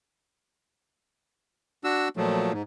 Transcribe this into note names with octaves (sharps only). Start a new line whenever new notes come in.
D4 F#4 E6
A#2 F3 F#3 A3
G#2